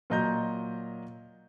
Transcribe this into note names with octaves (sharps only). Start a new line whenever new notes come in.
A#2 F#3 D#5 A#5 G6